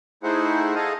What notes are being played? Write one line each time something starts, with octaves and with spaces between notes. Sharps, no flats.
A3 D#4 E4 G#4 C5 F#5
G#4 A4 D#5 F5